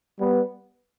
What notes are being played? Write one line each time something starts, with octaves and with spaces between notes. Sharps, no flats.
G3 B3